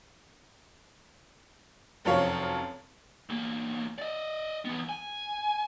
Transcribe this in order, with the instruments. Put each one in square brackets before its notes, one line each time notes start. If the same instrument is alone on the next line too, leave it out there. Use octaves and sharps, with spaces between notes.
[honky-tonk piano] F1 F#2 F3 C#5 F5
[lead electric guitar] E2 A#3
D5 D#5
E3 B3
G#5